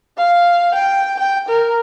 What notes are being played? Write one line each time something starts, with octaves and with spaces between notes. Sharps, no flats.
F5
G5
G5
A#4